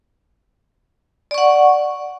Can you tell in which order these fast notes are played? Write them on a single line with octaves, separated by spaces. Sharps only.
D5 C#6 F#5